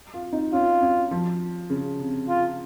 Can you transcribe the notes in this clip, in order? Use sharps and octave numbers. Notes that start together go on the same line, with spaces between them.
F4
D#4
C#4 F4
C#4
F3
C#3
C3
F4